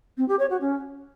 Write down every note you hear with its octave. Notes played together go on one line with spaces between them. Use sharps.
C4
G4
C#5
F#4
C#4